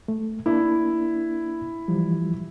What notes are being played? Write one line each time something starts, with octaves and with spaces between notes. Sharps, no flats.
A3
A#3 D4 E4
E3 F3 G3